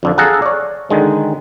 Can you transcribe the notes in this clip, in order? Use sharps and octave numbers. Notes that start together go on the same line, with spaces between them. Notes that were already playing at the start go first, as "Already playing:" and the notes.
F2 D3 F3
G#4 A4 F5 F#5 A5 A#5
C#5 D5
D3 D#3 G#3